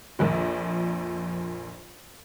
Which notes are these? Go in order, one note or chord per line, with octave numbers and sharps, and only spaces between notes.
A#1 F2 A#2